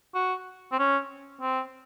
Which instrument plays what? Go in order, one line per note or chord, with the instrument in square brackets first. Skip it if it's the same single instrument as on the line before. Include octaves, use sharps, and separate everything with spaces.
[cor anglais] F#4
C4
C#4
C4